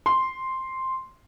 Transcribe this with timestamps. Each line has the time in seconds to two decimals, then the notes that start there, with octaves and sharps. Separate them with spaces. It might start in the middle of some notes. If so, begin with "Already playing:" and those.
0.06 C6